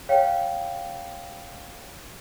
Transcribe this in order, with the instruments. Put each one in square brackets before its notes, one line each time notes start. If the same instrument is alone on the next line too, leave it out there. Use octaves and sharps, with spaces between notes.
[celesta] C#5 F5 G5